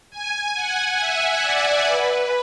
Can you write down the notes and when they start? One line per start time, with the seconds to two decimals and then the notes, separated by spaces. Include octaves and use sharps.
0.10 G#5
0.54 F#5
0.98 E5
1.42 D5
1.85 B4